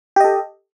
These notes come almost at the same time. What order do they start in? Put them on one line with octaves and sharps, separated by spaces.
G4 D#5 A4